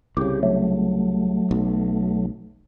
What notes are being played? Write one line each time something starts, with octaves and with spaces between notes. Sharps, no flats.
C2 C#3 G4
F#3 A3
B1